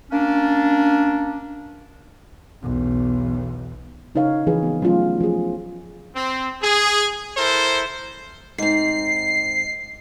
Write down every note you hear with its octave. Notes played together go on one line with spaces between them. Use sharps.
A#3 C#4 D4
B1 E2
C#3 D#4 A#4 C#5 F5
E3 F3 C4 G#4 B4
B3 F#4
F#3 A3 C#4 F4
F3 G#4
C4
G#4
E4 A4 A#4 C5
G#2 C4 C7